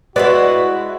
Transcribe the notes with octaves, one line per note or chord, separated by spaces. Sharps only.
G#3 E4 F#4 B4 D5 F#5